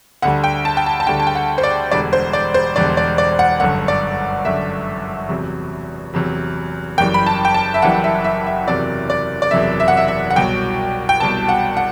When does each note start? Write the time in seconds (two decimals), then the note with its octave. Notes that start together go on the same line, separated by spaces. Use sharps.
0.22 D2 D3 G3 F#5
0.44 G5
0.65 A5
0.77 G5
0.86 A5
1.00 A5
1.07 D2 D3 G3 G5
1.19 A5
1.27 G5
1.35 F#5
1.58 C5
1.63 D5
1.91 E1 E2 D3 G3 D5
2.13 C5
2.33 D5
2.54 C5
2.76 E1 E2 D3 G3 D5
2.97 D5
3.18 D5
3.39 F#5
3.60 G1 F#2 D3 F#5
3.88 D5
4.45 G1 F#2 D3 E5
5.29 E2 C3 F#3
6.14 E2 C3 F#3
6.98 F#1 F#2 E3 G3 G5
7.14 B5
7.26 A5
7.45 G5
7.54 A5
7.74 E5
7.82 F#1 F#2 E3 G3 F#5
8.04 E5
8.24 E5
8.46 E5
8.67 F#1 E2 C3 F#3 D5
9.10 D5
9.42 D5
9.51 F#1 E2 C3 F#3 E5
9.80 E5
9.88 F#5
9.97 E5
10.08 E5
10.30 F#5
10.36 C2 B2 F#3 G5
11.09 G5
11.20 C2 B2 F#3 A5
11.49 F#5
11.77 F#5